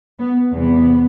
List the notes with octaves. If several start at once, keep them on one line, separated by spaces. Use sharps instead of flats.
B3
E2 C3 E3 G3 B3